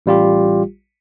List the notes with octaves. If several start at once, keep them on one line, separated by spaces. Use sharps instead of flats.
A1 G3 F4 G4